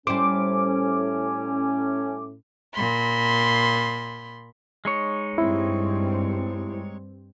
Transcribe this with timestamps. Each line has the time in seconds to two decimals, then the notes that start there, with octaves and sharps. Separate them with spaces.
0.07 A2 G3 C#4 C5 D6
2.75 A#2 B5 C6
4.85 G#3 D#4 C#5
5.38 G2 G3 C4 E4